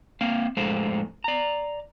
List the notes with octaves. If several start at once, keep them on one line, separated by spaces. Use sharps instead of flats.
A#3 C4 F5
F2 A2 G#3 A4 C5 F5
D5 A#5